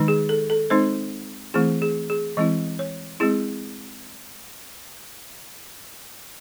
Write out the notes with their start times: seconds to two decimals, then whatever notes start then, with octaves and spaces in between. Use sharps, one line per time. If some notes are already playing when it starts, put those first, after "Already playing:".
Already playing: D#3 G#3 D#4
0.08 G#4
0.29 A4
0.50 A4
0.70 G#3 C4 D#4 C5
1.54 E3 A3 C4 E4 G#4
1.82 G#4
2.10 G#4
2.37 E3 G#3 C4 E4 D#5
2.79 C#5
3.20 G#3 C4 E4 G#4